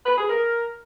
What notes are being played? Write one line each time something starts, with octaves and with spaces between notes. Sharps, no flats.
B4
G#4
A#4